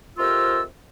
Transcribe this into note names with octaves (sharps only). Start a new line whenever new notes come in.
F2 C3 F4 G4 A#4 E6